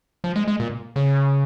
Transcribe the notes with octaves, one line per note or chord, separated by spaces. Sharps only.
F3
G#3
G#3
A#2
C#3